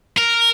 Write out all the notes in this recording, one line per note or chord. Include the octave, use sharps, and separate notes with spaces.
A#4